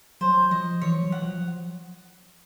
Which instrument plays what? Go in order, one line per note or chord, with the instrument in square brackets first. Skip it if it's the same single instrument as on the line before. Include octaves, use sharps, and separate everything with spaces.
[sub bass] F#3 [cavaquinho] C5
[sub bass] F3 [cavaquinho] D#5
[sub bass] E3 [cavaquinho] C#5
[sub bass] F#3
[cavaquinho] F#5
[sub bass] F3